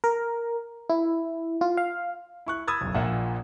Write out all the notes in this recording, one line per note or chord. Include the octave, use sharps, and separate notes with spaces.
A#4
E4
F4
F5
E4 C#6 F#6
B5 D#6 E6 G#6 A6
F#1 B1
A#1 A#2 E5 F#5